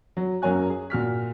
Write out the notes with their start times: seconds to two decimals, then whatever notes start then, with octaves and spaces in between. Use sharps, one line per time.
0.17 F#3
0.42 F#2 F#3 A#3 C#5 G#5 F#6
0.70 G#4
0.90 A#2 F#4 F6 B6